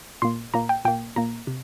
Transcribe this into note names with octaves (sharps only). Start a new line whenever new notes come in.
A#2 A#3 C6
A#2 A#3 A#5
G5
A#2 A#3 G5
A#2 A#3 A#5
C3